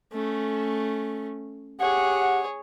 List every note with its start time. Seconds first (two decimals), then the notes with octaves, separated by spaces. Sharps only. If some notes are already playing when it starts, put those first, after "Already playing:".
0.13 A3 C#4
1.80 G4 G#4 C#5 F#5